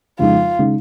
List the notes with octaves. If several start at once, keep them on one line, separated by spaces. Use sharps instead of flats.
F2 C#3 G#3 D#4 F4
C#3 G#3 D#4